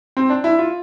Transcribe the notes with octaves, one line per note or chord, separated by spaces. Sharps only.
C4
D4
E4
F4